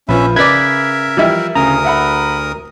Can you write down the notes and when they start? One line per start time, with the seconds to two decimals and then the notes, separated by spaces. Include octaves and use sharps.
0.09 A#1 F3 C#4 B4 E5
0.36 C#3 A#4 B4 D5 E5 G#6 B6
1.17 E3 F3 G3 E4
1.55 D2 C#3 A#4 A#5 D#6
1.84 E5 F#5 B5